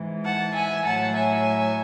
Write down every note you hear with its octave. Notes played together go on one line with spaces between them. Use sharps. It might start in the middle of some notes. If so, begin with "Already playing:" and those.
Already playing: G#2 E3
F#5 A5
E5 G#5
A2 F#3 F#5 A5
E5 G#5